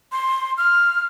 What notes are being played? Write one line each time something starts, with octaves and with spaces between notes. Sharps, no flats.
C6
F6